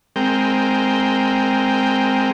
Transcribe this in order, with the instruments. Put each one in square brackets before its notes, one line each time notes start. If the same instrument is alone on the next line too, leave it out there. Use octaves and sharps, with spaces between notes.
[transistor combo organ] G#3 C4 A#4 G5